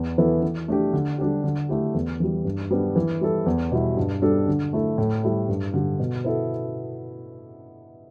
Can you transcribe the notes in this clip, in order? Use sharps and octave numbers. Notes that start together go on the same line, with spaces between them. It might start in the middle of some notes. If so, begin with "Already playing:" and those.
Already playing: E2
E3 B3 E4 A4
E3
A3 D4 G4
D3
G3 D4 G4
D3
A3 E4 G4
E2
E3 G3
G2
G3 B3 D4
E3
G3 E4 A4
E2
B2 G3 E4
G2
G3 D4 A4
D3
A3 E4 A4
A2
G3 E4 A4
G2
D3 G3
B2
B3 E4 A4